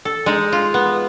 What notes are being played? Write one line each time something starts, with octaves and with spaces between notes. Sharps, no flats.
A4
G#3 D#4
F4
B3